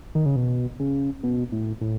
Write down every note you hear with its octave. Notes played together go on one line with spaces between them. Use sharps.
D#3
C#3
B2
C#3
B2
A2
A2